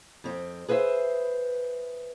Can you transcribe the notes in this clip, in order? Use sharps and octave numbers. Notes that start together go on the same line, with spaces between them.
F2 C4
G#4 B4 C5 E5